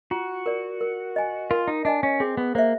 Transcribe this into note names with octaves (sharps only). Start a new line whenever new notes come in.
F4 F#4
A#4 D5
A#4
D#5 G#5
F4 A#4
D#4
D4 D#5 G#5
C#4
C4 G#4
B3
A#3 C5 E5